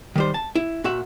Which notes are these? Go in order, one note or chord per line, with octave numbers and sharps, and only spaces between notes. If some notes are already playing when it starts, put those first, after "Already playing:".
D#3 G3 C5
A5
E4
A#2 F#4 E5 F#5